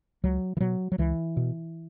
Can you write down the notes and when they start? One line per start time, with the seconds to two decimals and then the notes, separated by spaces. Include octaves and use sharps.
0.23 C#2 F#3
0.57 E3
0.61 B2 F#3
0.92 F#3
0.98 C#2 E3
1.37 B2